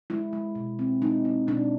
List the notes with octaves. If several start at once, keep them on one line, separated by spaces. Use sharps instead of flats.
G#3 E4
G#3
B2
C4
G#3 D#4
C4
B2 D4